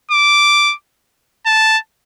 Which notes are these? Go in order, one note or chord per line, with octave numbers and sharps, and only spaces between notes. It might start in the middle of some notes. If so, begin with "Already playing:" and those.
D6
A5